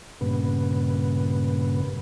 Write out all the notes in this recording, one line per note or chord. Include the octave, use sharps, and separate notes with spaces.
G2 A#2 C#3 B3